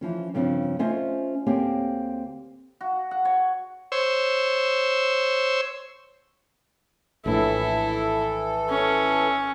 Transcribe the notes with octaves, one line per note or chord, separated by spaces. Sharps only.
E3 F3 C#4
G2 C#3 F3 C4 D4
A3 C#4 F4 C5 D#5 F5
D2 A#3 C4 G4 C#5 G#5
F#4
F#5
C#5
C5 C#5 E6
A#1 A2 E3 E4 A4
C#4